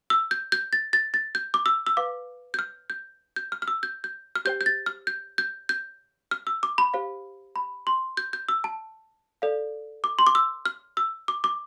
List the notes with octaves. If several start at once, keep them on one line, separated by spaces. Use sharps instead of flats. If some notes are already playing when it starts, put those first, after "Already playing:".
E6
G6
G6
A6
A6
A6
G6
D6
E6
E6
B4 F5 D6
G6
F6
G6
G6
F6
F6
E6
G6
G6
F6
G4 C5 G5 G6
G6
A6
F6
G6
G6
G6
F6
E6
D6
B5
G4 C5 F5
B5
C6
G6
G6
E6
A5
A4 D5 F5
D6
C6
D6
E6
F6
E6
D6
D6